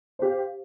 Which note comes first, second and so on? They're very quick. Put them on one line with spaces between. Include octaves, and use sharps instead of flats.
C5 G4 F5